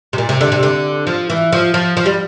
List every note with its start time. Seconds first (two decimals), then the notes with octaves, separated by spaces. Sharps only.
0.13 C3
0.18 A#2
0.29 C3
0.41 D3
0.52 C3
0.63 D3
1.07 F3
1.30 E3
1.52 F3
1.74 F3
1.97 F3
2.06 G3